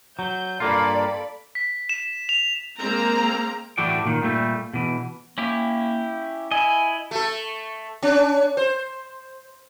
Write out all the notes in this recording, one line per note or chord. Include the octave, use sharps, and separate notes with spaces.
F#3 G6
G2 A#3 F4 A4 D5 B5
B6
E7
F7
G#3 A#3 C4 A#5
A2 E3 F#4 A4 D5 G5
A#2 D#3
A#2 G3 A3
B2 E3
A#3 C#4 E4 G4
E4 D#5 G#5
A3 A4
C#4 D4
C5